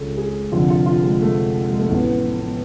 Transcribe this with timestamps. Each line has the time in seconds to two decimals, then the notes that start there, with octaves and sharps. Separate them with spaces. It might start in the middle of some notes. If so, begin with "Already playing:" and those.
Already playing: C#2 C#3 G#4 A4
0.17 G#4
0.52 F1 F2 D3 F4
0.70 F4
0.86 F4
1.03 G#3
1.21 A3
1.70 G#3
1.79 A3
1.90 A1 A2 B3
2.24 A3
2.41 B3